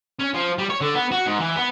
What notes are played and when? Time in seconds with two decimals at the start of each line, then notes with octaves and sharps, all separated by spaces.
0.19 C#4
0.34 F3
0.59 G3
0.70 C#5
0.81 D3
0.95 B3
1.11 F#4
1.26 G#2
1.39 E3
1.55 B3